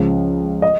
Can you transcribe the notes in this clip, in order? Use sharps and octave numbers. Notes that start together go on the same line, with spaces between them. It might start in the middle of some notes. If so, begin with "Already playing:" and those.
Already playing: C#2 C#3 F3
D#5